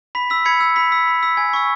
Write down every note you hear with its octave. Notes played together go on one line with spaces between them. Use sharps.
B5 B6
E6 B6
B5 G#6 C#7
E6
B5 B6
E6 B6
B5
E6 B6
G#5 G#6
C#6 E6 B6